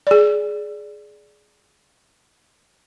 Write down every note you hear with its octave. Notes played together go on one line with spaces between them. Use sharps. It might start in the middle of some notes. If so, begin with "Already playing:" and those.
G#4 D5